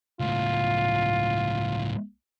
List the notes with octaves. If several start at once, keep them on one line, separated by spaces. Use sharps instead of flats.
C#2 A2 F4